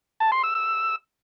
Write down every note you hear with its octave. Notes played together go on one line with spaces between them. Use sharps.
A5
C6
E6
E6